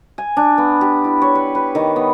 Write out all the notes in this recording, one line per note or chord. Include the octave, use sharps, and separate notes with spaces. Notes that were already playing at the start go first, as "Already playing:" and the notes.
G#5
D4
B3
G4
E4
C#5
B4
B4
D#3
B3